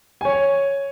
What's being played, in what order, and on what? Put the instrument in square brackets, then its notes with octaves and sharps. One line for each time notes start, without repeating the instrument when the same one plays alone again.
[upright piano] C#5 G#5